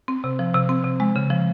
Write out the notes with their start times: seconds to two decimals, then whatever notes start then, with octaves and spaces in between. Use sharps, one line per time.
0.08 C4
0.24 C3
0.39 F3
0.54 C3
0.69 C4
0.84 C3
1.00 G#3
1.16 C#3
1.30 F3